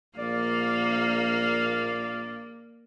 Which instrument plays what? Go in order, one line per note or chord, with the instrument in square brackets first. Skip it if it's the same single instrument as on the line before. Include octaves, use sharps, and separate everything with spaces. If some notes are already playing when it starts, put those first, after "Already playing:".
[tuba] A#1 [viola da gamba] A#3 [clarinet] D5 [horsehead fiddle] F5